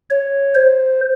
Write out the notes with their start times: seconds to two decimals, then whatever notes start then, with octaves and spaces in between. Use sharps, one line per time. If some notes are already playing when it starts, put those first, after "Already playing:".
0.10 C#5
0.55 C5